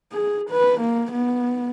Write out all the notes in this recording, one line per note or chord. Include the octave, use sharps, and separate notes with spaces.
G#4
B4
A#3
B3